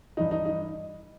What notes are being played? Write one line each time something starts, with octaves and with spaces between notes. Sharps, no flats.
G2 E3 D#4
D#4
D#4